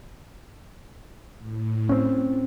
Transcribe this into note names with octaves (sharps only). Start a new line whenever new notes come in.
A2
C4 C#4